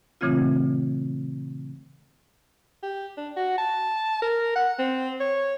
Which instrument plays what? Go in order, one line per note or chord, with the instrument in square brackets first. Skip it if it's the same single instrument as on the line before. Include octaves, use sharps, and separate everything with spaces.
[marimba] A#2 C#3 E3 A3 C4 F4
[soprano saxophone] G4
D4
F#4
A5
A#4
F#5
C4
C#5